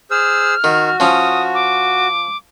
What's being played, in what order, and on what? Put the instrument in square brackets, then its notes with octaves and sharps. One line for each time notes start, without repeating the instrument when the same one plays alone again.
[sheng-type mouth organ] G#4 C5 E6 [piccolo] F6
[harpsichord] D#3 [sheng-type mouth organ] F#4
[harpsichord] F3 C#4 [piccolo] D#6
[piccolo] D6